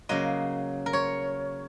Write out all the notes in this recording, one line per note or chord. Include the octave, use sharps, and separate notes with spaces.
C#3 F#3 A#3 D#5
A#4
C#5